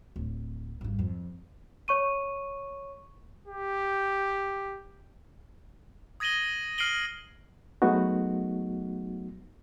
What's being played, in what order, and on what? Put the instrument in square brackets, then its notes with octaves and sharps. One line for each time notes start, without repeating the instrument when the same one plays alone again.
[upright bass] D1
G#1 G2
F2
[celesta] C#5 C#6 D#7
[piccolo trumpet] G4
[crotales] D#6 G#6 A#6 D#7 F#7 G7
F6 C7 D7 D#7 F#7 G7
[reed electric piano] F#3 G#3 A3 B3 D#4 F#4